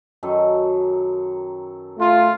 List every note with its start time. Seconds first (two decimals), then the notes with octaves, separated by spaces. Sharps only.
0.23 F#2 D#3 A4
1.98 A3 F4